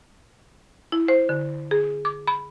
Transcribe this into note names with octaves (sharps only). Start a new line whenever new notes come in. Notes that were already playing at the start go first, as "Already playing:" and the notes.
E4
C5
D3
G#4
D6
B5